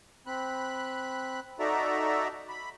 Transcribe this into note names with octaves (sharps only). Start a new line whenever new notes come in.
C4 B5 F#6
D#4 F#4 A4 D5 E5 A#5
B5